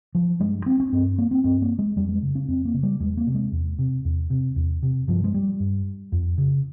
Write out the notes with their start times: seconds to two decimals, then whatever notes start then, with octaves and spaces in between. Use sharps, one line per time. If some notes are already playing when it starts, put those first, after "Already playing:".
0.15 F3
0.40 G2 G#3
0.66 C4
0.80 C#4
0.92 G2 C4
1.18 A#3
1.31 C4
1.44 G2 C4
1.62 A#3
1.79 G#3
1.96 F2 G3
2.09 G#3
2.22 C#3
2.35 C#4
2.48 F2 C4
2.65 A#3
2.74 C#3
2.83 G3
3.00 E2 G#3
3.17 A#3
3.27 C3
3.34 G#3
3.52 E2
3.79 C3
4.05 E2
4.30 C3
4.56 E2
4.83 C3
5.08 G2 F3
5.24 G#3
5.34 G3
5.60 G2
6.12 F2
6.38 C#3